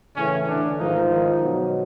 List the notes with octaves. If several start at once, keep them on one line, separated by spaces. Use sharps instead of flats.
A2 C#3 E3 C#4
D3 D4
G#2 D#3 F3 D#4
D#3 D#4
B2 F#3